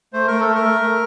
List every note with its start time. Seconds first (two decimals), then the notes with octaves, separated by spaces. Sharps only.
0.13 A3 C5
0.27 A3 A#4
0.40 A4
0.47 A3
0.55 A#4
0.64 A3
0.81 A3